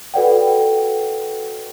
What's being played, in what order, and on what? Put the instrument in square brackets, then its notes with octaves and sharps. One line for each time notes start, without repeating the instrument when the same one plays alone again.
[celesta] F#4 A4 B4 D5 F#5 G5